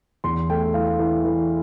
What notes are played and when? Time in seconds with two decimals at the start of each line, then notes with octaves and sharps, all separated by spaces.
0.24 E2 C6
0.50 A3 G5
0.74 E3 F5
0.99 E3
1.24 E3